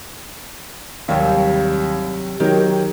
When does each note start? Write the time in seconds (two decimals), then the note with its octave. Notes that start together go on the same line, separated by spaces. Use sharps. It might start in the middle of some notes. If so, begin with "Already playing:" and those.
1.08 D#2 C3 F#3 G3
2.40 D#3 F#3 G4 A#4